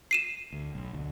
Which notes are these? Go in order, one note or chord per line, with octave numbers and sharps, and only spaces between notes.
C7 D#7 E7
D2
B1
D2